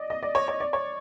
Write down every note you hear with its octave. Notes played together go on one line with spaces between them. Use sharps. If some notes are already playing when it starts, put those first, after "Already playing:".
Already playing: D5 D#5
D#5
D5
C#5
C#5
D5
C#5